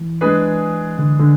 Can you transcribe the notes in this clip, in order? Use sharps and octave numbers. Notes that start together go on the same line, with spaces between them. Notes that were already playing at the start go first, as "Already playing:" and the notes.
Already playing: E3
G#3 D4 G#4 B4
D3
D3